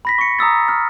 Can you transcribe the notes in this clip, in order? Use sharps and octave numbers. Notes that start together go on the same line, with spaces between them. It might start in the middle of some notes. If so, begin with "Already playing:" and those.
B5 A#6 B6
C#6 C#7
A#5 D#6 E6 A6
F6